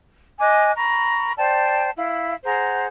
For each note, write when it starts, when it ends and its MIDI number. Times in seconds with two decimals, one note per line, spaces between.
0.39 0.72 75
0.39 0.72 80
0.39 0.72 86
0.39 0.72 90
0.76 1.33 82
0.76 1.33 83
0.76 1.33 85
1.38 1.89 72
1.38 1.89 74
1.38 1.89 79
1.38 1.89 81
1.97 2.34 64
1.97 2.34 77
2.45 2.86 68
2.45 2.86 72
2.45 2.86 78
2.45 2.86 82